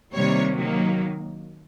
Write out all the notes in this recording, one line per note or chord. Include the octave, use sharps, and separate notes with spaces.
C3 D#3 G3 A#3 C#5
D#3 F#3 A#3